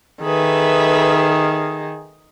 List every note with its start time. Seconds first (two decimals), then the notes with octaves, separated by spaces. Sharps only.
0.24 D#3 G#4 A4 B4 E5